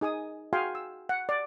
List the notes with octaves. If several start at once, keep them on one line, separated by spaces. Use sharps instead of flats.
D#4 G#4 G#5 D#6
F#4 G#4 F5 G5 G#5 C6
E6
F#5
D5